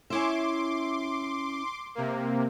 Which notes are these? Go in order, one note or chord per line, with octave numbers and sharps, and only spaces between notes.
C#4 E4 E5 C6 D6
C3 A#3